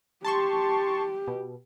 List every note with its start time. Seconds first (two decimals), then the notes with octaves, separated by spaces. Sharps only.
0.25 G4 A5 C6 C#6
1.28 B2